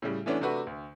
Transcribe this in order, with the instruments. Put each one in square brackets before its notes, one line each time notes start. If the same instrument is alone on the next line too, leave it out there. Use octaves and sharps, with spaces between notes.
[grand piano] A2 C#3 G3
E3 A3 B3 C#4 D4
C3 A3 D4 F#4 B4
D2